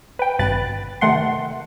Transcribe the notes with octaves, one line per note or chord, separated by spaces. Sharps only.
B4 G5
G#1 G2 B2 B4 F#6 A6
C3 D#3 A3 F#5 C6